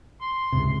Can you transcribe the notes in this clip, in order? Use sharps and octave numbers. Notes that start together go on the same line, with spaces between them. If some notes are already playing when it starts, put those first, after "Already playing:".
C6
C#2 G#2 C3